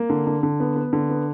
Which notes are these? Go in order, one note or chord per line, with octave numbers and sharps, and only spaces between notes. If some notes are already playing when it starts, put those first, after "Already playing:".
Already playing: A#3
D3
D3
D3
B3
B3
D3
B3